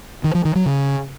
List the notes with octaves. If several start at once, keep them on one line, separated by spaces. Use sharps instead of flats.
D#3
F3
D#3
F#3
C#3